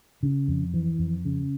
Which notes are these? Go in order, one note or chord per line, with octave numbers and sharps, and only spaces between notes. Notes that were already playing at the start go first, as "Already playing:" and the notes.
C#3
F2
E3
F2
C#3